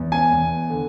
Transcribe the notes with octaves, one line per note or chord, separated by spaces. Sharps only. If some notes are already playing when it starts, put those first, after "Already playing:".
Already playing: E2
G#5
E2
D3